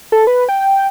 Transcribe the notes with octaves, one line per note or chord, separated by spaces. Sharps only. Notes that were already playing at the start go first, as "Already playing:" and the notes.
A4
B4
G5